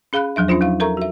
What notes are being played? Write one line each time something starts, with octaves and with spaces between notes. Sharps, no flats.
C#4 G#4 F5 B5 F#6
E2 F3 F#3 D4 E5
C#4 D4 F4 C5
F#3 D#4 F5
A4 A#4 E5 A#5 C#6
F#4 E5